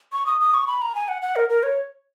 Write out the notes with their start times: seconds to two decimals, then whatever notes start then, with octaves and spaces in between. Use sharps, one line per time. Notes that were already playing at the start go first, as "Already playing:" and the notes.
0.12 C#6
0.26 D#6
0.41 D#6
0.54 C#6
0.67 B5
0.82 A#5
0.95 G#5
1.08 F#5
1.22 F#5
1.36 A#4
1.49 A#4
1.63 C#5